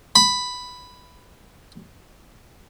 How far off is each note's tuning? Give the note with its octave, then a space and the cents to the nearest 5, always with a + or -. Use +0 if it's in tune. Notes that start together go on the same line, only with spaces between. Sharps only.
B5 +5